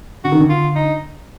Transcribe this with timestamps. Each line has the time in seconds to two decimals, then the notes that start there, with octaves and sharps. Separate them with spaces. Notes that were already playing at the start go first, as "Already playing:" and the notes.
0.24 D3 F#4
0.32 D#3
0.40 D3
0.50 F4
0.76 D#4